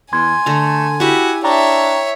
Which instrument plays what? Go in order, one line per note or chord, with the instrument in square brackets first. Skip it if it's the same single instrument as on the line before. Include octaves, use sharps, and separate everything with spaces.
[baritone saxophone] E2 [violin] G#5 [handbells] C6 G#6
[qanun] D3 A#5 [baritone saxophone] A3
[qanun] E4 G4 [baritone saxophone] F#4
[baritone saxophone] D4 [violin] C#5 E5 [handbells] G5 A#5 C#6